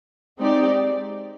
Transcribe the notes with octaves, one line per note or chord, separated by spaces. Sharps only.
G#3 C4 D#4 G4 D5